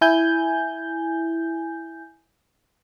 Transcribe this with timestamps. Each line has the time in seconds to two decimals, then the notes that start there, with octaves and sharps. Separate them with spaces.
0.01 E4 G#5 G6